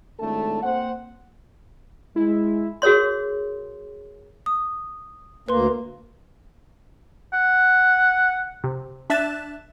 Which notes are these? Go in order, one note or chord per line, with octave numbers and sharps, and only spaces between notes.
G#1 A2 A3 D4 A4 A5
A#3 C4 C5 F#5
G#3 E4
F#4 G#4 A#4 C#5 C6
D#6
D2 A#3 B4 C6
F#5
C3
D4 E5 F#6 A6 E7